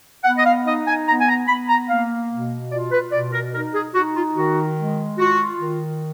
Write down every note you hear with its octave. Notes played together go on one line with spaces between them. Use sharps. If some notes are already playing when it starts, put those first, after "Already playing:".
B3 F#5
D#5
F5
D#4 D#5
G#5
B3 A#5
G#5
A#5
B3 B5
A#5
A#3 F5
B2
F4 D5
B4
B2 D5
A#4
D#4 A#4
G#4
D#4 F#4
F4
D#3 F#4
G#3
F4 F#4
D#3